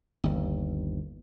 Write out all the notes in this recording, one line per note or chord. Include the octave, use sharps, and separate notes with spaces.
G1 D#2